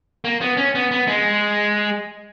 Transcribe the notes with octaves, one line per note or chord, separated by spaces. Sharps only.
A#3
B3
C#4
B3
B3
G#3